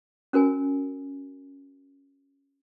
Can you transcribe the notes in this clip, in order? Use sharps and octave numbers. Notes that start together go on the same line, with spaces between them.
C#4 F#4 A#4 G#5